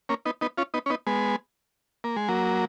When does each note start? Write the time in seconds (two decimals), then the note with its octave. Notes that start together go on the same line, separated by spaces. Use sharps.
0.09 A#3 C#4
0.25 B3 D#4
0.41 B3 D#4
0.58 C#4 F4
0.74 B3 D#4
0.86 C#4
0.90 B3 D#4
1.07 G#3 B3
2.04 A#3
2.16 G#3
2.28 F#3 A#3